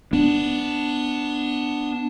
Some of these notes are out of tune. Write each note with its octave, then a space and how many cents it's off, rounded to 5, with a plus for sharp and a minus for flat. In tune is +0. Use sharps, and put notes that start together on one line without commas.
B3 +0 D4 +0